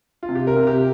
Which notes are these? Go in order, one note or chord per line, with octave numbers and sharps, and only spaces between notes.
F4
C3
G4
A#4
C3
G4